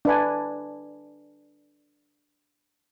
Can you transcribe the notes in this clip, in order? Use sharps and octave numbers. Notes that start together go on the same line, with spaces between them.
D4 B4 G#5